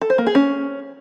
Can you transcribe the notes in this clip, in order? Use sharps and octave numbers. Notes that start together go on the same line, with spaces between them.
A4
C5
A#3
G#4
C#4